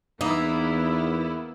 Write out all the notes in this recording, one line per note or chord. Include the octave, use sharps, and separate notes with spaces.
E2 A#3 B3 D#4 E4